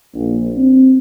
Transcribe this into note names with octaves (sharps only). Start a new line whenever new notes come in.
A#1
C4